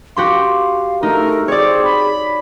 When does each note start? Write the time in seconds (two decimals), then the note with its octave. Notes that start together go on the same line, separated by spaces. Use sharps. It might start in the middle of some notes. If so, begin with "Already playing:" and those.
0.16 F#4 G4 F5 C6
1.03 A3 D#4 A#4
1.48 C4 G#4 C#5 D5
1.84 B5